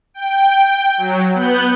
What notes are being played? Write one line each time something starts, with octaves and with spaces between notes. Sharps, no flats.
G5
F#3
B3 F#6 G6